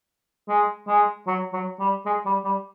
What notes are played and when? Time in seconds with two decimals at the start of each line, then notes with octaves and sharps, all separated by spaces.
0.49 G#3
0.88 G#3
1.27 F#3
1.53 F#3
1.79 G3
2.06 G#3
2.26 G3
2.45 G3